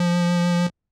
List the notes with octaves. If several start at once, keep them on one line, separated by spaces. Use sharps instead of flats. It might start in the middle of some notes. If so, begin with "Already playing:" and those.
Already playing: F3